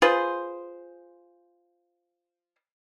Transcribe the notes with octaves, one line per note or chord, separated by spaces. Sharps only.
F4 G#4 B4 C5